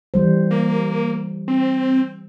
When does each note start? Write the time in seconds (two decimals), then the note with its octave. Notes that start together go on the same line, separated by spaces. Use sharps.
0.14 E3 G3 C5
0.51 A#3
1.48 C4